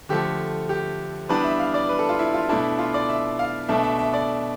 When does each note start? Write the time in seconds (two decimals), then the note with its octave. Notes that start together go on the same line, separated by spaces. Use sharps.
0.09 D3 F3 A3 G4
0.69 G4
1.29 E3 G3 B3 D4 B4
1.44 E5
1.59 F5
1.74 D5
1.89 B4
1.99 A4
2.09 F4
2.19 E4
2.34 F4
2.49 B2 A3 D4 E4
2.79 F4
2.94 D5
3.09 E5
3.39 F5
3.68 B2 A3 D4 E5
3.83 E5
3.99 E5
4.13 D5